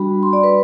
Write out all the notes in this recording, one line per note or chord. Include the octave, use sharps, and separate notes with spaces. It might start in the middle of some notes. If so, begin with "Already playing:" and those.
Already playing: G3 D4 F#4 B5
C6
D5
B4